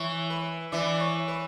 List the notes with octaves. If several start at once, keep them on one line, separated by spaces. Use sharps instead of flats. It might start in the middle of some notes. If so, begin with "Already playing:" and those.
Already playing: E3 C#5
B4
E3 D5
C#5
B4